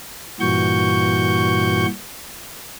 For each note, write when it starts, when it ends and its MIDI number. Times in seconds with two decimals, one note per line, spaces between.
0.40 1.86 43
0.40 1.86 46
0.40 1.86 52
0.40 1.86 66
0.40 1.86 85
0.40 1.86 91